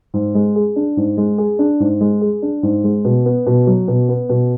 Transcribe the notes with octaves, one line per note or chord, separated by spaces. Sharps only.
G#2
G#3
G#4
D4
G#2
G#3
G#4
D4
G#2
G#3
G#4
D4
G#2
G#3
B2
B3
B2
F#3
B2
B3
B2